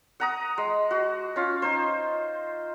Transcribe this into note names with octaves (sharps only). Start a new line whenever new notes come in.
F#5 A#5 D#6
G#3
F#4
C#4 F4
D#4 C5